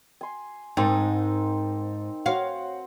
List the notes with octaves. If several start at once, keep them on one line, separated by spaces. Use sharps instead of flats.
G#5 C6
G#2 C4 D#4 A#4 A5
F#4 C5 C#5 F5 F#5